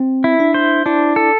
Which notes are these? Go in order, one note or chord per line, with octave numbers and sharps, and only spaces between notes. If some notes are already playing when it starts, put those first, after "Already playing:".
Already playing: C4
E4
D4
C5
D4 E4
A4